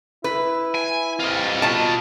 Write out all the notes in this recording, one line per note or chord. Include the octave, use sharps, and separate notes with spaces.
E4 B4
G#5
C2 F4 D#5
B2 A5